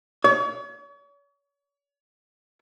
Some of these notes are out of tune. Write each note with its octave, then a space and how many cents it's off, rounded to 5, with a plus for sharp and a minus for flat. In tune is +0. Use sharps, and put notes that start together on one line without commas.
C#5 +40